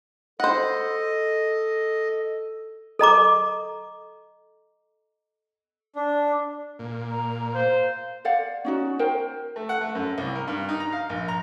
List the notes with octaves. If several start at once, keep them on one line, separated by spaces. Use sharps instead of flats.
A4 C5 D#5 F#5
A4 D#5 A#5 D6
D4
A#2
A#5
C5 F5
C5 D5 F5 F#5
C#4 D#4 F#4
A#4 C5 G5
A3
F#5
A3
F#2
C2
A#4
G2
D#4
A#5
F5
A#1
A#5